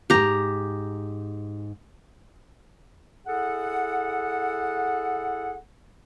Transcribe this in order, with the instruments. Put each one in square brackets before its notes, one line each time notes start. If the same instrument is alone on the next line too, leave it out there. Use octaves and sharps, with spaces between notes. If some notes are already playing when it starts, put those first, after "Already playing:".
[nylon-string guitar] E2 G#2 [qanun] G4 A#5
[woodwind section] E4 G#4 A4 F#5